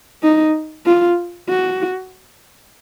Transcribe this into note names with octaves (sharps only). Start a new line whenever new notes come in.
D#4
F4
F#4